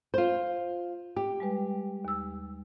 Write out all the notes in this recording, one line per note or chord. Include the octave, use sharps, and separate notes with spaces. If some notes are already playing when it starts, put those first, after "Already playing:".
F4 C5
G4
G3 G#3 B4
D#2 E6